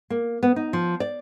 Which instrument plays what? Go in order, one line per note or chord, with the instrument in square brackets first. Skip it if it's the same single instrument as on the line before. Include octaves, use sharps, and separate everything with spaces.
[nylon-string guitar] A#3
B3
D#4
F3
D5